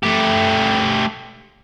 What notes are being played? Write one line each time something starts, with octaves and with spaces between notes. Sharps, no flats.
A3 G4